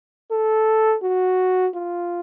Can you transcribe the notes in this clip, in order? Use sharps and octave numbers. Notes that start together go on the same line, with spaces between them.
A4
F#4
F4